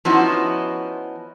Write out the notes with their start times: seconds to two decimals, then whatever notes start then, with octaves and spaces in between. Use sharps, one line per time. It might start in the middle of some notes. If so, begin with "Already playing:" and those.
0.05 F3 B3 C#4 D#4 E4 F#4